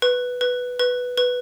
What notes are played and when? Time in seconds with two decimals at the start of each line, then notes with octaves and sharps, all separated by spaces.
0.02 B4
0.41 B4
0.80 B4
1.18 B4